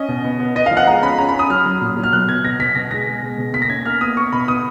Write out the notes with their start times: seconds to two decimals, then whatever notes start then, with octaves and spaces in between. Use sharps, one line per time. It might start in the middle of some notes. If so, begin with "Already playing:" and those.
Already playing: C#4 D#5
0.08 B2
0.24 B3
0.40 B3
0.55 B3 D#5
0.66 F3 F5
0.77 F#5
0.87 G#3 A#5
1.03 C#4 B5
1.18 C#4 A#5
1.29 B5
1.34 C#4
1.39 D#6
1.50 F#3 F6
1.65 F#3
1.81 A#2
1.97 F#3
2.04 F6
2.12 B2 F#6
2.29 B3 G#6
2.44 B2 A#6
2.59 B2 B6
2.75 B2 A#6
2.91 G#3 A#6
3.07 G#3
3.22 B2
3.38 B2
3.54 A#3 B6
3.62 A#6
3.70 C#4 G#6
3.85 A#3 F6
4.01 B3 D#6
4.17 B3 C#6
4.32 B2 B5
4.48 B3 D#6